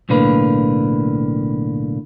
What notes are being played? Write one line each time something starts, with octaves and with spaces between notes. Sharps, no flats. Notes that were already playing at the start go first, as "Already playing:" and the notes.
B1 A2 D3 A#3 B4